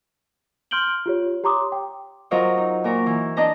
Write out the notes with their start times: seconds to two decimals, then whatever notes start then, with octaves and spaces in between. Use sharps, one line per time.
0.71 C6 F6 G6 D7 F#7 G7
1.06 F4 G4 C#5
1.44 G4 C#5 A#5 C6 D6 D#6
1.72 G5
2.31 F#3 F4 A#4 C5 C#5 D#5
2.57 D#4
2.84 A#2 A#4 C#5
3.06 E3
3.37 D4 D#5 A5 A#5